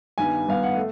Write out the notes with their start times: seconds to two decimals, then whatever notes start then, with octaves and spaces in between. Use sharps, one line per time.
0.18 G2 D#3 G3 B3 G#5
0.47 G2 D#3 G3 B3 F5
0.63 F#5
0.76 A3